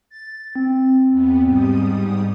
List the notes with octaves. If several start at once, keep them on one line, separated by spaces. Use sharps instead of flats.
A6
C4
E2 B3
G#2 G3 D#6